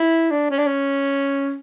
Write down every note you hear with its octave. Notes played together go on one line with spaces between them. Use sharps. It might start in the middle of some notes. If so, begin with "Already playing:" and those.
Already playing: E4
D4
C#4
D4
C#4